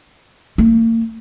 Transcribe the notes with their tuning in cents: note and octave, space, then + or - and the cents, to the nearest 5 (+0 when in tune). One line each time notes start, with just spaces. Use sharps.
A#3 -40